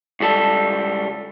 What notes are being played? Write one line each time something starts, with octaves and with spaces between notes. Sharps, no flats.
C#2 G3 A4